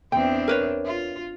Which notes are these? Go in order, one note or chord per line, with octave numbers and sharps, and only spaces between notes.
E2 C4 D4 G5
A#4 B4 C#5
F4